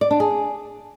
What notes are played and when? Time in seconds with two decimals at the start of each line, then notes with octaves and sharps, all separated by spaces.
0.01 D5
0.11 D4
0.20 G#4